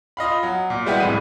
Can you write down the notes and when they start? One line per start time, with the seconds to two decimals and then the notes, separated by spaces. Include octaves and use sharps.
0.17 F4 D#5 F5 B5
0.43 F#3
0.70 A#2
0.86 G3 G#3 B3 E4 G4
1.00 C2 F2 A2 E3 G#3 D#7